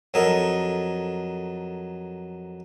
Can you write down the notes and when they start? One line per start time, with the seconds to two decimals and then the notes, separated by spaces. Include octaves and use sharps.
0.14 F2 F#3 A4 A#4 D#5